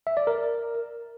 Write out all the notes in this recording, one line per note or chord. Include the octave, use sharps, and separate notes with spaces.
E5
D5
A#4